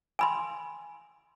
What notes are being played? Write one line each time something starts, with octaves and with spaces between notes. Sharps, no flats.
G#5 B5 C6